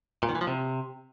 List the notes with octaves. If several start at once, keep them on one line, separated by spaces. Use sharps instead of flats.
A#2
D#3
E3
F3
C3